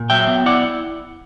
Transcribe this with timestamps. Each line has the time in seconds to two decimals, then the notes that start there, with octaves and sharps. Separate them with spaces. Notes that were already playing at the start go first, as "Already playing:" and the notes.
Already playing: A#2
0.10 F#3 E5 G5
0.27 B3
0.46 E4 D5 F#5